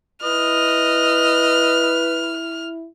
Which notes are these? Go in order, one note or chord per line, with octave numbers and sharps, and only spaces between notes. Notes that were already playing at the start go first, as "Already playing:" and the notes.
E4 B4 D#5 F6